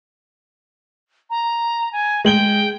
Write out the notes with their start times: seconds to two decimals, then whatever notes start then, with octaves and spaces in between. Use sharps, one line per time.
1.30 A#5
1.92 G#5
2.25 G#3 G5 F#7 G7